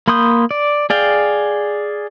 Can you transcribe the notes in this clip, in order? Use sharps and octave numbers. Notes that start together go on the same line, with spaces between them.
A#3 B5 C6 D#6 G6
D5
G#4 D5 F5 G5